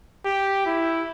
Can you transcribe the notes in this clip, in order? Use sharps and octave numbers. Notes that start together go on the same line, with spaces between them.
G4
E4